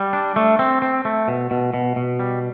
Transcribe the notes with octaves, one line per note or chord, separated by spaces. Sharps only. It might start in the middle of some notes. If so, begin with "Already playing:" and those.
Already playing: G3
D4
A3
C4
C4
A3
B2
B2
B2
B2
G3